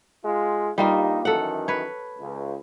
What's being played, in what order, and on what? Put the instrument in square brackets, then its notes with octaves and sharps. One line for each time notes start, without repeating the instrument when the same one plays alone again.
[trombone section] G#3 F4
[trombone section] G2 D#4 [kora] G3 A#3 F4
[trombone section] F#2 D#3 E3 [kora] A4 F#5
[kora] B4 C#5
[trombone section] C#2